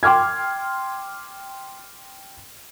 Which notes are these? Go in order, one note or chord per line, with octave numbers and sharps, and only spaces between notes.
G5 C6 D6 F6 G#6